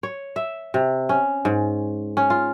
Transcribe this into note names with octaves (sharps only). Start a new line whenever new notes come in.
C#5
E5
C3
C#4
G#2
C#4
F4